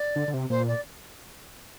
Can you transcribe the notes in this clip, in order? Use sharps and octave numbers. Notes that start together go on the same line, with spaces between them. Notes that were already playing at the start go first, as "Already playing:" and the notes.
Already playing: D5
D3
D3
C3
A#2 C5
D5